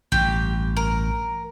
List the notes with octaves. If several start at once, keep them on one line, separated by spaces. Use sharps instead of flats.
A1 G2 G4
A#4